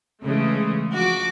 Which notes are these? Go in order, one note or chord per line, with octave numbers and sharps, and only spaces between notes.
C#3 E3 G#3 A3
F3 F#4 D6